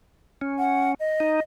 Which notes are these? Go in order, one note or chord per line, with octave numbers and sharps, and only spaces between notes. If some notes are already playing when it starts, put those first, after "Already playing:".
C#4
F#5
D#5
D#4